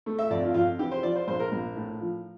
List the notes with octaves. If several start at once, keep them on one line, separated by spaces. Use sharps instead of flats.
A3
E5
F2 D5
F4
F2 F4
E3 G4
C5
F3 D5
C5
A#1 C5
A#4
A#1
A2
F3